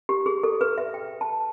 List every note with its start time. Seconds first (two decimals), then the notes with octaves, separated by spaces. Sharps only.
0.09 G4
0.26 G#4
0.43 A4
0.61 B4
0.78 E5
0.94 G5
1.21 A5